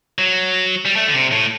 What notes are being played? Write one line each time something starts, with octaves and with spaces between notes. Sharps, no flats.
F#3
G3
A3
D3
C3
A2